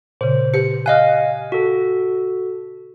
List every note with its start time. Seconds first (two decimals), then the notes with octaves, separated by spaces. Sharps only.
0.21 A#2 C#3 C5
0.54 G4 B4 C#7
0.86 D#5 F5 G#5 F6 F#6
1.52 F#4 A4